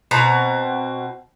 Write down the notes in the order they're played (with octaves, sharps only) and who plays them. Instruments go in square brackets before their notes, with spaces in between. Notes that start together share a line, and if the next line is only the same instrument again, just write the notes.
[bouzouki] B2 C4 A#5